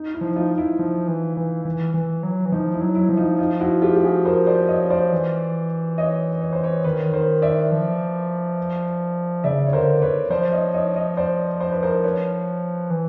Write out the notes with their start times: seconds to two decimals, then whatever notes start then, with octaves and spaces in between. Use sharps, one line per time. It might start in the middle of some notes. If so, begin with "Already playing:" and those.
Already playing: D#4
0.14 E4
0.21 F3
0.36 D#4 F4
0.58 E4
0.79 F3
1.08 E3
1.37 E3
1.65 E3
1.94 E3
2.23 F#3
2.45 E3
2.52 F3 D#4
2.74 E4
2.81 F#3
2.95 E4
3.09 F3
3.17 D#4 F4
3.39 D#4 F4
3.60 E4 F#4
3.82 F4 G4
3.95 G4
4.03 F#4 G#4
4.25 A#4 C5
4.47 C5 D5
4.68 C#5 D#5
4.90 C5 D5
5.12 E3
5.98 C#5 D#5
6.41 C#5
6.53 C5
6.64 B4 C#5
6.84 D#3 B4 C#5
7.14 A#4 C5
7.42 D5 E5
7.71 F3
9.44 C#3 D5 E5
9.67 C#5
9.73 D3 A#4 C5
10.02 B4 C#5
10.30 F3 C5 D5
10.53 C#5 D#5
10.74 C#5 D#5
10.96 C#5 D#5
11.17 C5 D5
11.61 C5
11.72 B4
11.82 A#4 C5
12.03 B4 C#5
12.90 E3